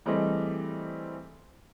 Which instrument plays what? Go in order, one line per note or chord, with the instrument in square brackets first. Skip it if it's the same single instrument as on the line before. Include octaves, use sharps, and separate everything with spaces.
[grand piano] E3 G3 A3 C4 G#4 D#5